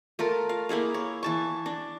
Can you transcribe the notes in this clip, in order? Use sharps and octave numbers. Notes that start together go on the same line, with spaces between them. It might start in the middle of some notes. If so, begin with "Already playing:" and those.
A3 F4 A#4
F5
A#3 E4 G#4 F5
C#5
E3 A5 C#6
D4